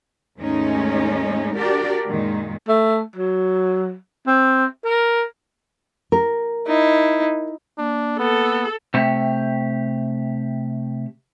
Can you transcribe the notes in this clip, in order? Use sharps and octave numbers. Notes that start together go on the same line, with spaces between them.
D#2 G#2 G#3 A3 C#4 D#4
D4 F#4 G4 A#4 D5
F#2 A#2 D#3 G#3
A3
F#3
C4
A#4
A#4
D#4 E4
A#3 D4
B3 A4
C3 A3 G4